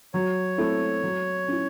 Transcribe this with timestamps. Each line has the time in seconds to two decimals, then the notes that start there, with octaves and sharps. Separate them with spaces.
0.14 F#3 C#5
0.58 A3 C4 E4
1.03 F#3
1.48 C#4 E4